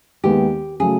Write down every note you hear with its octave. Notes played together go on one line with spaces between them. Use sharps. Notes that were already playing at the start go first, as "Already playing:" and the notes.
D#2 D#3 G#3 B3 G4
C#3 F#3 A3 G#4